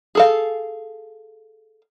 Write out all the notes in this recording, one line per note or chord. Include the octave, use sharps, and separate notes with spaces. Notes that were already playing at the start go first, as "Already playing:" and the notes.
G#4 A4 F5